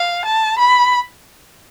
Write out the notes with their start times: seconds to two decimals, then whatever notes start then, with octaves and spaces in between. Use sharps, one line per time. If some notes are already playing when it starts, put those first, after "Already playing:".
Already playing: F5
0.25 A5
0.58 B5